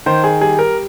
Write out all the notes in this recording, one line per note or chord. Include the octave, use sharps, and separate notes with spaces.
D#3 C5
G#4
G3 G#4
A#4